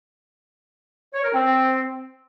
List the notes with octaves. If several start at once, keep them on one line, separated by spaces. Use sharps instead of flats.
C#5
A#4
C4